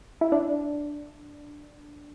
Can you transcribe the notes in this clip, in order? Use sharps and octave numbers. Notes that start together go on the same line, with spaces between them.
E4
D4